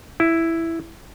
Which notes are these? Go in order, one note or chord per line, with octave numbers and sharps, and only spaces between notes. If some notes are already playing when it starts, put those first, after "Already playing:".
E4